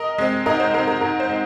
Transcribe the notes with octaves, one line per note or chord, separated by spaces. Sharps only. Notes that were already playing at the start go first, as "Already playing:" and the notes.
Already playing: A#4 D#5
G#3 C4
G#2 A#4 D#5
C5
G#3 C4 A#4
A#4
G#2 A#4
C5
G#3 C4